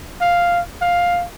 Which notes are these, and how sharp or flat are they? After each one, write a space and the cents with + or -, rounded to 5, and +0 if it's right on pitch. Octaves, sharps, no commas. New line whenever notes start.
F5 +0
F5 +10